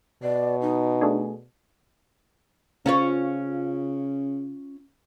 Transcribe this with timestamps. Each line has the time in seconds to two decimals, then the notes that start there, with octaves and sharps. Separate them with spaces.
0.23 B2 D5
0.62 D#4
1.01 A3 D4 G#4
2.86 C#3 C#4 F4 C#5